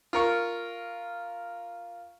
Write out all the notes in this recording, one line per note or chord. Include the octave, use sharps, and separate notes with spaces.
F4 A#4 C#6